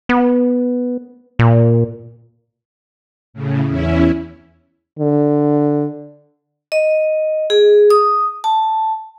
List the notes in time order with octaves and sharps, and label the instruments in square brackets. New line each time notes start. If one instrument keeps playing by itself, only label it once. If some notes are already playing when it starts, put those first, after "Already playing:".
[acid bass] B3
A#2
[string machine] A2 C#3
E2 C#4 E4
[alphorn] D3
[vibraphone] D#5
G#4
D#6
A5